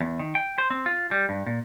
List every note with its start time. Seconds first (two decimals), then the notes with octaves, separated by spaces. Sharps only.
0.01 E2
0.19 D#3
0.35 G5
0.58 C5
0.70 C4
0.86 F4
1.11 G3
1.29 G2
1.47 A#2